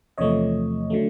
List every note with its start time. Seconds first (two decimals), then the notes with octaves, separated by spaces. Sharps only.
0.18 E2 C3 F3 A3 C#5 D#5
0.90 D3 F#3 A3